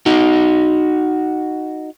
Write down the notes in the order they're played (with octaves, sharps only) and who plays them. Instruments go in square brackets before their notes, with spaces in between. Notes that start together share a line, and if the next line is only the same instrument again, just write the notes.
[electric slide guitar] D#4 F#4